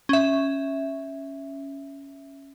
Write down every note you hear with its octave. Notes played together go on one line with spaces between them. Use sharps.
C#4 E5